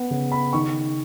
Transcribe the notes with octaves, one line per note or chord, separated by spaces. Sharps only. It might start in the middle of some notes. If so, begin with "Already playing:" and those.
Already playing: B3 F#5
C#3
B5
D#3 C#6